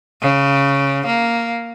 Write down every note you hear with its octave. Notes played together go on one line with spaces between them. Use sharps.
C#3
A#3